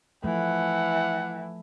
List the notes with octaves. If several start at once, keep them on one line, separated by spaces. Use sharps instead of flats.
E3 F3 A3 F#5